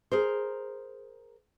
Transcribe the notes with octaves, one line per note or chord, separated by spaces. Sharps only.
G#4 A#4 C5